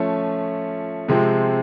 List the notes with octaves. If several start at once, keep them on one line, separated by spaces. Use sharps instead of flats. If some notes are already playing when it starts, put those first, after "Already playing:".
Already playing: F3 A3 C#4
C3 F3 G#3 C4